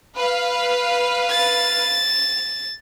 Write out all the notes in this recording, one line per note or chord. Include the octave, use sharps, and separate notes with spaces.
B4 F5
A6